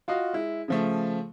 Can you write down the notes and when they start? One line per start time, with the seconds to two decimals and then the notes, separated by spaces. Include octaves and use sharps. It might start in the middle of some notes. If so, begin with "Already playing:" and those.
0.08 F4 F#4 D#5 F5
0.33 G#3 E4
0.68 C#3 F3 A3